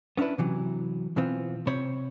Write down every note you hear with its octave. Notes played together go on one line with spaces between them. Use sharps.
B3 C#4 D4 E4 B4
C3 E3 F#3
B2 E3 B3 C4 F4
C3 C4 C5 C#5 B5